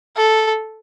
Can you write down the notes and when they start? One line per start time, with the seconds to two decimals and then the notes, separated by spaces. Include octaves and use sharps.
0.16 A4